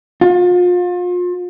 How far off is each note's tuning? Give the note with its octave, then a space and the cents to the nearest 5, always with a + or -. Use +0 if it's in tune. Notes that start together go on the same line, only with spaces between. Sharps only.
F4 +35